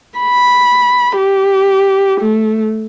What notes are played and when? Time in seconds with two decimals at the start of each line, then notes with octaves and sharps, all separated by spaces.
0.19 B5
1.17 G4
2.21 A3